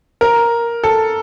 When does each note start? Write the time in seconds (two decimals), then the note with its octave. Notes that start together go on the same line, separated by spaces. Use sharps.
0.21 A#4
0.84 A4